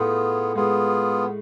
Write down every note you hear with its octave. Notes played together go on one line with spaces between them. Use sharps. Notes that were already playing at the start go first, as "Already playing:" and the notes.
Already playing: A2 A3 B3 F4 G#4
G#3 B3 F4 G#4